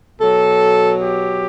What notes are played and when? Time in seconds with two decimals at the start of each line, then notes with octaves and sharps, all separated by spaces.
0.19 B2 F#3 A4
1.03 G4